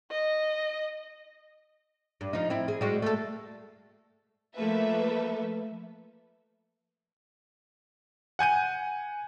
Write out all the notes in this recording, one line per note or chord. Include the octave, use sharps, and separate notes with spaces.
D#5
G2
F3 D#4
C4 E4
G#4
G3 G#3 F#4
A3 A4
F3 A3 A#3 A4 B4 E5
F#5 G#5 G6 D#7